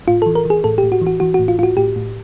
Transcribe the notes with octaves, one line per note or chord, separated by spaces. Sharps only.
A2 F4
E3 A4
A#4
E3 G#4
A2 A4
G4
A2
F#4
E3
F#4
E3 F#4
F#4
A2
F4
A2 F4 F#4
A2 G4
A2